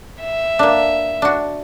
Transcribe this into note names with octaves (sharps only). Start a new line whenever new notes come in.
E5
A#3 D4
D4 F#4